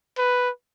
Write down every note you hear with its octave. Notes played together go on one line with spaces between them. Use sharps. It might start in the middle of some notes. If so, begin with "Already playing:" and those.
B4